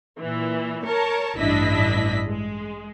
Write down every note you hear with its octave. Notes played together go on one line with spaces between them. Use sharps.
A#2 E3
A#4 C#5 A5
A1 G2 D4 E4 D#5 B6
G#3